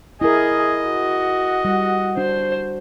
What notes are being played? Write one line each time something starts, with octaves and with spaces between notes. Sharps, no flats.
E4 G#4 A#4 D#5
F#4
G3
D4 F#4 C5